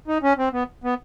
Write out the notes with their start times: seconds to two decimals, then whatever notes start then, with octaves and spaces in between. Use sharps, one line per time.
0.07 D#4
0.23 C#4
0.38 C4
0.53 B3
0.84 B3